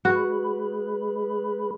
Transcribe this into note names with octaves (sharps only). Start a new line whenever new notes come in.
G#3 F#4 B4